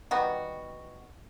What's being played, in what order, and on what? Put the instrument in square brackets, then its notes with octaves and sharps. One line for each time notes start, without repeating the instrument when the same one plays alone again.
[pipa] D#3 G3 B3 F#4